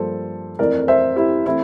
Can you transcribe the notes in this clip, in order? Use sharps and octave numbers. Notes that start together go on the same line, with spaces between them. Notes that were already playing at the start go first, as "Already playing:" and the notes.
Already playing: G2 F3 A#3 A4 C5
F2 E3 A3 C4 A#4 D5
C5 E5
E4 G4
E3 A3 C4 E4